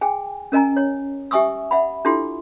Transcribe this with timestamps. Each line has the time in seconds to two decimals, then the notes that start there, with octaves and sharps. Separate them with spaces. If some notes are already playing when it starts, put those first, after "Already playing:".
0.01 G#4 G5 G#5
0.52 C#4 A#4 D#5 G#5 A#5
0.77 C#5
1.31 G4 E5 G#5 C#6 D#6 E6
1.71 E5 F#5 B5
2.05 D4 E4 F4 G4 A4 C6